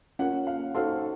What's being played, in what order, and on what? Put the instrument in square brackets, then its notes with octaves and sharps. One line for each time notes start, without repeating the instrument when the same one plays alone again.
[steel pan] C#4 F4 A#4 [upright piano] F#5
[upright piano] F5
[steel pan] D#4 F#4 C5 F5 C6 [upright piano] A4